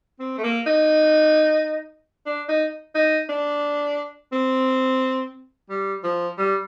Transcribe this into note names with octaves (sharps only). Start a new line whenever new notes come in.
C4
A3
A#3
D#4
D4
D#4
D#4
D4
C4
G3
F3
G3